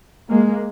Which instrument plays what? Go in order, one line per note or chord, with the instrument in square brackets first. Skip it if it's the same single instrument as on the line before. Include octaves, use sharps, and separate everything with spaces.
[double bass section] G#3 A#3